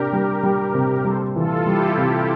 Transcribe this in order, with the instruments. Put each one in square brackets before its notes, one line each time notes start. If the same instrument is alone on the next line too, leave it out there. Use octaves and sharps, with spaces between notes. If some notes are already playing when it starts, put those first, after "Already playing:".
Already playing: [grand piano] C3 D4 [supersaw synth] G4 A#4
[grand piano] G3
G3
C3
[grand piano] G3 [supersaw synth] A4 C5
[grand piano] E3 [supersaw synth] F4 A4
[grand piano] G3 [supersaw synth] E4 G4
[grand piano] C3 [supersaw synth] E4 G4